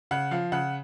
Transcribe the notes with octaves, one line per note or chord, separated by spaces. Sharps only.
C#3 F#5
F3 F5
C#3 F#5